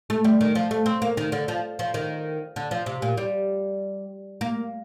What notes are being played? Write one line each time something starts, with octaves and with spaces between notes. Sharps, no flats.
A3
G3
D#3
F3
A3
C4
A#3
D#3
D3
F3
F3
D#3
D3
F3
C3
A#2
G3
A#3